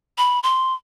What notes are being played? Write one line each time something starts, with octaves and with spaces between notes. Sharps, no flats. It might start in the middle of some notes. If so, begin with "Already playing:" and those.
B5
C6